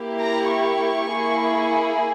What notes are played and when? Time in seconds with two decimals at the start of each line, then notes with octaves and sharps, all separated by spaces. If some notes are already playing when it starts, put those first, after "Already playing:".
Already playing: A#3 E4 G4
0.20 A#5
0.50 C#6
1.11 A#3 E4 G#4